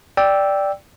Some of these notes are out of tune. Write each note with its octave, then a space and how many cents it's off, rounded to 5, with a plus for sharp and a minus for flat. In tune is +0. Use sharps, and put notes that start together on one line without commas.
D5 +0 G5 +0 E6 +0